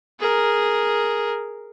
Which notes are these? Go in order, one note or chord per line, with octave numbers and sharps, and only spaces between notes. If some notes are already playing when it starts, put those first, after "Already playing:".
G#4 A#4